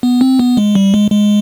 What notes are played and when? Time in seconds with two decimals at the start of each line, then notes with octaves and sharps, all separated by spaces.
0.03 B3
0.21 C4
0.39 B3
0.57 G#3
0.75 G3
0.94 G#3
1.11 G#3